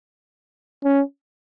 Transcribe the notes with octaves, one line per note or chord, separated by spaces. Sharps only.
C#4